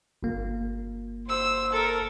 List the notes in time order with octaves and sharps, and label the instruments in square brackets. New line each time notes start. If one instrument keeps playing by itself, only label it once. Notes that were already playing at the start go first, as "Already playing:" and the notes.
[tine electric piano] G1 A#3
[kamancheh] C5 E6
A4 A#4